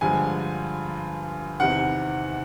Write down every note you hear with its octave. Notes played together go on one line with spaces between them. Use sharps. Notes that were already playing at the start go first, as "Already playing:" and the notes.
G2 D3 F3 G#3 G#5
E2 C3 D#3 F#5